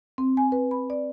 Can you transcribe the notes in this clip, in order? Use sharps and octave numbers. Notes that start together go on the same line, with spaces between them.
C4
G#5
B4
B5
D5